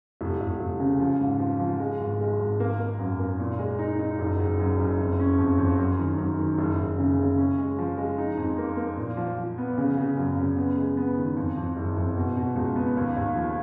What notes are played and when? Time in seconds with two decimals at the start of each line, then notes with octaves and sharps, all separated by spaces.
0.21 F1
0.41 F1
0.60 F1
0.80 C#3
1.00 F3
1.21 G#2
1.39 F3
1.60 F3
1.79 G#3
2.00 G#1
2.20 G#3
2.40 G#1
2.60 A#3
2.79 A#3
2.99 F#2
3.19 A#3
3.40 A#2
3.59 G#3
3.79 D#4
3.99 D#4
4.19 F#1
4.40 F#1
4.59 F#2
4.79 F#1
4.99 F2
5.19 C#4
5.38 F2
5.58 F2
5.78 F#2
5.99 D#3
6.18 F#2
6.39 D#3
6.58 F#1
6.78 F#1
6.98 C#3
7.19 C#3
7.37 C#4
7.58 G#3
7.78 F3
7.97 G#3
8.18 D#4
8.37 F2
8.58 A#3
8.77 A#3
8.97 A#2
9.17 F3
9.38 F3
9.58 B3
9.78 C#3
9.97 C#3
10.17 F#2
10.37 C#3
10.56 B3
10.77 G#3
10.97 B3
11.17 D#3
11.37 F2
11.57 F2
11.76 F#1
11.96 F2
12.16 B2
12.37 B2
12.56 C#2
12.76 B3
12.97 D#2
13.16 D#2
13.35 F3